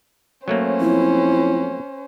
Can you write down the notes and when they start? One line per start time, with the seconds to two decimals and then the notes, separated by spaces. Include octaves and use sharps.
0.48 F#3 A3 A#3 C#4 C5
0.81 F2 E4